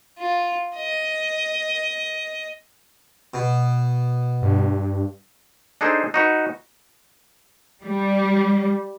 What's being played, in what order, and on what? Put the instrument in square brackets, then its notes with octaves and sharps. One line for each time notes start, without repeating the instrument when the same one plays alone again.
[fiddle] F4
D#5
[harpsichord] B2
[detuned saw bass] G2
[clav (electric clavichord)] D4 D#4 G#4 A4 C5
D#4 F#4 B4
[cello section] G3